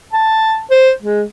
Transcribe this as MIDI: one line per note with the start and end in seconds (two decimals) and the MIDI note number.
0.13 0.60 81
0.71 0.92 72
1.02 1.23 56